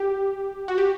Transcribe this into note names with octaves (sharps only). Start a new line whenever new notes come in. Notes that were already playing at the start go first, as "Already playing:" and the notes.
Already playing: G4
F#4
G4